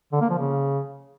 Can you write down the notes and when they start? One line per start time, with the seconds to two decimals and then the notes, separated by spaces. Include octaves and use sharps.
0.12 D3
0.21 A#3
0.30 F3
0.38 C#3